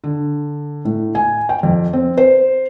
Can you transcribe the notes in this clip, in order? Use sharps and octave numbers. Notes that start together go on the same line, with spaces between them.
D3
A2
G#5
G5
F2
C4
C5